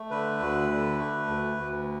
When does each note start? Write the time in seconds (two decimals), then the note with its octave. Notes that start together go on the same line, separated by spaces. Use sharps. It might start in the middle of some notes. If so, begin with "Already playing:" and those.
Already playing: A3
0.11 D3 B4
0.40 D2
0.69 D3
0.99 A3
1.27 D2
1.57 D2